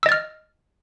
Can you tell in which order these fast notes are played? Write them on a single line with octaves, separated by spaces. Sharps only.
E6 D#5 A6 F6